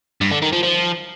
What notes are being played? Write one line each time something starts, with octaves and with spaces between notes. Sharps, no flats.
G2
D3
D#3
F3
F3